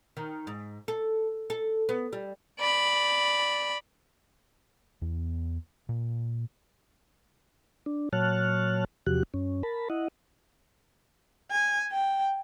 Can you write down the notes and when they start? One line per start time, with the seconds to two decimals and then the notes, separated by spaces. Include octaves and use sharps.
0.17 D#3
0.47 G#2
0.88 A4
1.50 A4
1.89 B3
2.13 G3
2.60 D5 B5
5.02 E2 B3
5.89 A#2
7.86 D4
8.13 A#2 F#3 C#5 A5 F6 F#6
9.07 E2 C3 F3 F#4 G4 F#6
9.34 F#2 C#4
9.63 A#4 A5 B5
9.90 E4 D#5 F#5
11.51 G#5
11.92 G5